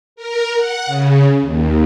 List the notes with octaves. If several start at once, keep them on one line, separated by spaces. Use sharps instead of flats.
A#4
F#5
C#3
D#2